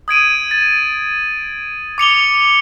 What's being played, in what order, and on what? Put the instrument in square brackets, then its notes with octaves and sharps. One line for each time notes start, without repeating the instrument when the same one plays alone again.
[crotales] D#6 G#6 D7 D#7
A6
D6 C#7 F7 G7